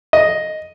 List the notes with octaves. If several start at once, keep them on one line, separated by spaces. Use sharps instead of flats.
D#5